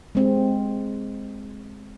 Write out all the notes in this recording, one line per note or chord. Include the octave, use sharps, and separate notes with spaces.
G#3 C4